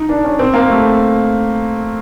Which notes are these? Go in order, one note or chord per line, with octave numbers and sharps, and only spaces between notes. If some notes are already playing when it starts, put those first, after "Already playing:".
Already playing: D#4
D4
C#4
C4
A#3
A3